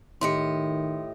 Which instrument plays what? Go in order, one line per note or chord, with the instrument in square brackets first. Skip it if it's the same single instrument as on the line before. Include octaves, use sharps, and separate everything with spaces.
[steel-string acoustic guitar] A2 G4 D#5 [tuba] D#3 [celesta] C6 C#7